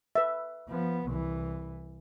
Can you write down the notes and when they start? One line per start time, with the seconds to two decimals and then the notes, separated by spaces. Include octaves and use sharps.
0.15 B4 E5
0.69 F3 B3
1.07 C2 E3